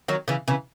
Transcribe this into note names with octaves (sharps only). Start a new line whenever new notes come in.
D#3 F#3
C#3 E3
C#3 E3